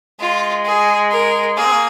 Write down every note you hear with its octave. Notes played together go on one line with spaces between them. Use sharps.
G#3 F4
G#4
A#4
A#3 G#4
C4
A#3